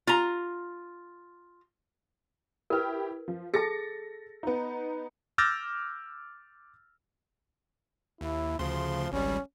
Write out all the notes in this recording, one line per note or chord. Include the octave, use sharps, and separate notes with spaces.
F4 A#5
E4 G4 A#4 B4
F3
G#4 A4 A5 A6 A#6 C#7
B3 D#4
D6 E6 F6 G6 A6 A#6
D#2 E4
D2 C#3 F3 C6
G#1 C#2 G3 C#4